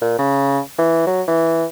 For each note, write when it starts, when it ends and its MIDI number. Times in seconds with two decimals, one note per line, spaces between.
0.01 0.18 46
0.18 0.59 49
0.78 1.02 52
1.07 1.22 54
1.28 1.65 52